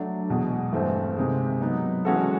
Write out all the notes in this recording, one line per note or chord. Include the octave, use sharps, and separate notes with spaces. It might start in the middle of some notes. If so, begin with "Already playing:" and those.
Already playing: F#3 A3 D4
E2 B2 G#3
G2 E3 A3 C4
C3 D#3 G#3
F#3 B3 D#4
E3 G#3 C#4 F#4 A4